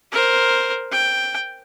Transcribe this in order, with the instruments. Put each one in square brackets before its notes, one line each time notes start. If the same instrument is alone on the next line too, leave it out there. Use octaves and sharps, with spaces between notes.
[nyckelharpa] A#4 C5
G5